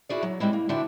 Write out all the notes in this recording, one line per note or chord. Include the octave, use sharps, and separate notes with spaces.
C#4 E4 F#4 G#4 D5
F#3
G3 G#3 C4 E4
A#3
D3 C4 D4 E4 F#4